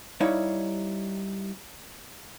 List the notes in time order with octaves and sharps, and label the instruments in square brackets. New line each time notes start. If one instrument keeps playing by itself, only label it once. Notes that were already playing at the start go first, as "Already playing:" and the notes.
[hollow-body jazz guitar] G3 D#4 E4 C#5 F5